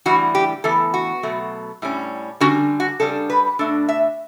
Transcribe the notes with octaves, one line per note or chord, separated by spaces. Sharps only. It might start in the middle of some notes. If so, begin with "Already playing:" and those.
A2 E3 G3 F#4
G4
A2 E3 B3 A4
F#4
B2 F#3 A3
A2 G3 C#4
D3 G3 C#4 F#4
F#4
C#3 G3 D4 A4
B4
B2 A3 D4 A4
E5